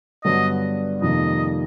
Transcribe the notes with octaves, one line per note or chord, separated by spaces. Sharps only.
G2 D3 F#3 B3 D#5
F2 C3 D#3 G3 A#3 D#5